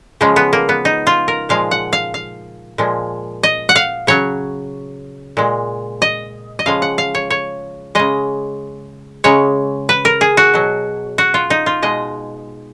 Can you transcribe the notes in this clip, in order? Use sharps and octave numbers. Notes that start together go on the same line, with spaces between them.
C#3 F3 G#3
B3
A#3
B3
D#4
F4
A#4
A#2 F3 G#3 F5
F#5
F5
F5
A#2 F3 G#3
D#5
F#5
F5
C#3 F#3 C#5
A#2 G#3
D#5
D#5
C#3 F3 G#3 F5
F#5
F5
C#5
C#5
C#3 G#3 D#5
C#3 G#3 C#5
B4
A#4
G#4
F#4
B2 F#3
F#4
F4
D#4
F4
B2 G#3 D#5